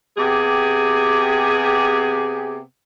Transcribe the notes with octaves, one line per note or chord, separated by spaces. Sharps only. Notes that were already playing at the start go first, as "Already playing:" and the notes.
C3 B3 G4 G#4